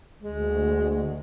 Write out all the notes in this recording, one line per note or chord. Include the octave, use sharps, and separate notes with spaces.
D2 G#3